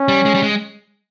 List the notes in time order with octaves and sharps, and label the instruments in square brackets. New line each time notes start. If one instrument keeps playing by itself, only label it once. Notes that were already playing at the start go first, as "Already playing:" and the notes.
Already playing: [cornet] C#4
[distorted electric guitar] G3
G#3
G3
G#3